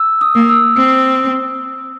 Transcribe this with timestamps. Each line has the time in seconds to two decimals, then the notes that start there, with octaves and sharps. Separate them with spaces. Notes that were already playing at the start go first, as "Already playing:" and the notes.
Already playing: E6
0.21 D#6
0.35 A#3
0.49 E6
0.77 C4 E6